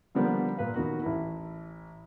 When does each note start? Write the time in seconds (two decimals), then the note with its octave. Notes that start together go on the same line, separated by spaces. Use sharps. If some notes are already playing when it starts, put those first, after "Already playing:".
0.15 D3 F3 G3 A#3 B3 D4
0.57 A#2 B4 F5
0.74 D#2 D#3 B3 F#4 A#4
1.02 A1 E3 E4